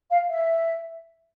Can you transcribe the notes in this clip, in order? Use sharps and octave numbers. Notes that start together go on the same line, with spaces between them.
F5
E5